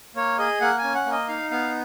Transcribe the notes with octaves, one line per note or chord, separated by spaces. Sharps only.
A#3 C#5
G#4 D#5
A#3 F#5
G#5
C#4
F#5
A#3
D#5
D#4 F5
B3 F5